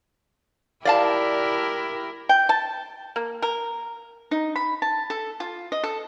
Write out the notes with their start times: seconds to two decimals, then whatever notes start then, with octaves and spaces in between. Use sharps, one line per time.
0.85 E4 G4 A#4 D5 F5 A5
2.29 G5
2.49 A5
3.16 A#3
3.42 A#4
4.31 D#4
4.56 B5
4.82 A5
5.10 A4
5.40 F4
5.72 D#5
5.83 A4